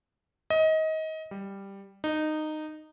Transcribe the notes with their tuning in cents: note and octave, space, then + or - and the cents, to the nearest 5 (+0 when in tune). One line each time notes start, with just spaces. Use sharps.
D#5 +25
G3 +5
D#4 -15